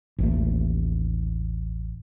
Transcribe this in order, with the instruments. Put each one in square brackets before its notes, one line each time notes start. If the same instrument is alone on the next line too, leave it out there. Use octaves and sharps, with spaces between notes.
[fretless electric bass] A1 D#2 A3